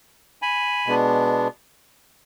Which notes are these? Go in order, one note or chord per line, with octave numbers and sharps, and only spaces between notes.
G#5 B5
B2 G#3 B3 D4